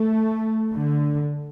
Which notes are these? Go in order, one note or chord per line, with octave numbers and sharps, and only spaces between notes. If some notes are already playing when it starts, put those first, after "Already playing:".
Already playing: A3
D3